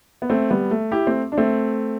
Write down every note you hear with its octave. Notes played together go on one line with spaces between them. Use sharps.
B3
A3 C4
G3 B3
A3
E4 G4
A3 C4
D4
A3 C4